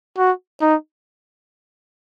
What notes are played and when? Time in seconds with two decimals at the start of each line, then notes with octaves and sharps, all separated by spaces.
0.18 F#4
0.61 D#4